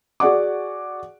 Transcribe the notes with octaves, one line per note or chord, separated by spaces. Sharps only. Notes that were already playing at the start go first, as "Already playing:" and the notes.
F#4 G#4 D5 F#5 D6